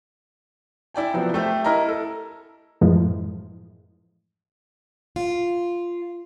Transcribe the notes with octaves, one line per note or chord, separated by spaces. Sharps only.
E4 D5 G5 G#5
C3 F3 F#3 B3 C4
A3 G4 C5 E5
E4 A#4 D#5 A#5
A4
F#2 A2 E3 F3 G#3
F4